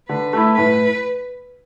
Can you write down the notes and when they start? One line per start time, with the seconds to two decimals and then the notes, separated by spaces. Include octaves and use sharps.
0.08 D3 B4
0.33 A3 E4
0.57 A2 B4